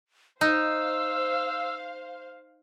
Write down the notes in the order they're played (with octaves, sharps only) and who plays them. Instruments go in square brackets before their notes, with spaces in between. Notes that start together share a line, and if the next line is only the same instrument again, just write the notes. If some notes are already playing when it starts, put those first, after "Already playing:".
[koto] D#4 [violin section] C5 F5 [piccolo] E6